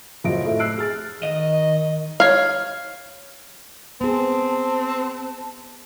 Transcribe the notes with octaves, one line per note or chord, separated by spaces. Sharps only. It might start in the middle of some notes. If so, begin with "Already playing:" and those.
F#1 F3 F#3 D#5 A#6 D7
A2 A3
E6 F#6 C7 D7
G#4 F6 A6
D#3 D#5
C#5 F5
B3 C4 G#4 A5